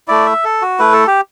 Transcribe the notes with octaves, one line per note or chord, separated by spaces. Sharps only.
A3 E4 D5
E5
A4
F#4
A3 E4 B4
A4
G4